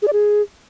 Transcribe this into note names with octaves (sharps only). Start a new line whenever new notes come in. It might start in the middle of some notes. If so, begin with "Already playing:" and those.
G#4
D5
G#4